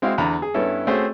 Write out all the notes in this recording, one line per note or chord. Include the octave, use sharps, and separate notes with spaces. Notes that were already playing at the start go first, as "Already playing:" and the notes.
G#3 C4 E4 F#4 F5
E2 D3 A#5 B5
G#4
G2 B3 C#4 E4 A4
A3 C4 C#4 F#4 G#4 C5